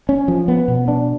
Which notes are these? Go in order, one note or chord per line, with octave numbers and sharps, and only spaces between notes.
C#4
F3
B3
B2
D4